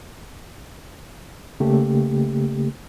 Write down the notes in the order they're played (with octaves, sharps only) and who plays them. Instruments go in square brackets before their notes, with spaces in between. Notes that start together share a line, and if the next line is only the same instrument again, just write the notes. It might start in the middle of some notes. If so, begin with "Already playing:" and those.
[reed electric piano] C#3 A3 A#3 G4